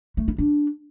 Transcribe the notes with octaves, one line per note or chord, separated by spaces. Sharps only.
A3
E4
D4